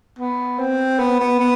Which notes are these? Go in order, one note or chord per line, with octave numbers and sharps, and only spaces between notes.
B3
C4
B3
B3
B3